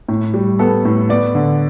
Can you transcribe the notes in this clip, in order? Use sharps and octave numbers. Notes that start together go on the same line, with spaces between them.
A2
G3
B3 A4
A2
B3 D5
D3